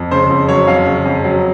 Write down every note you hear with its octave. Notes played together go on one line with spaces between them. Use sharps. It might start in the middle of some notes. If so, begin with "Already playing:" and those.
Already playing: F2
C#3 C5
F2
F#3 C#5
F2 F5
C#3
F2
F#3